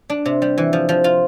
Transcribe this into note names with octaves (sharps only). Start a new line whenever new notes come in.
D4
C3
G3
E3
F3
F3
F4